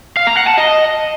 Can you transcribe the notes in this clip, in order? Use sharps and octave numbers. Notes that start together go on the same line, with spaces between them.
F5
A#5
F#5
A5
D#5